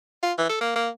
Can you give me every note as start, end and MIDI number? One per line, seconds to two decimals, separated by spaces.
0.23 0.33 65
0.38 0.47 52
0.49 0.57 69
0.61 0.73 58
0.76 0.90 58